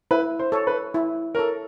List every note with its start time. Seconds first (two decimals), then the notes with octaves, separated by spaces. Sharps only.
0.11 E4 B4
0.39 C5
0.52 A4 C#5
0.67 B4
0.94 E4
1.35 A4 A#4 C#5